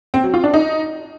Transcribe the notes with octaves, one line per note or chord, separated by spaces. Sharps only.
C4
F#3
F4
D4
D#4